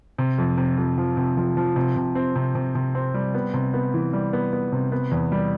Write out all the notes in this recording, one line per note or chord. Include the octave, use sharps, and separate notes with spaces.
C3
F2
C3
F2
F3
C3
F3
F3
C3
C3
C4
C3
C3
C3
C4
G3
B3
C3
B3
E3
G3
B3
B3
C3
B3
E2
G3